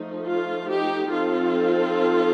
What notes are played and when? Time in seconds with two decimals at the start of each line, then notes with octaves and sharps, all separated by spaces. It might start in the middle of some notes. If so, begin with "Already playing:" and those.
Already playing: F3 A3 D#4
0.24 F4
0.67 D#4 G4
1.10 F3 C4 D#4 F4 A4